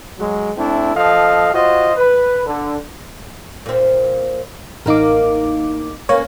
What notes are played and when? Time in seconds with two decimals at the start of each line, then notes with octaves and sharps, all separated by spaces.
0.19 F#3 G#3
0.57 A3 C4 D4 E4
0.95 F3 A4 D#5 F5
1.54 F4 F#4 C5 D#5
1.97 B4
2.46 D3
3.66 A#2 C4
4.86 A1 E2 A#3 D#4 A#4 D6
6.09 A#3 C#4 B4 C#5